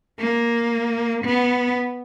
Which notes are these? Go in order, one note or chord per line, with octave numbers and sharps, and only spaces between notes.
A#3
B3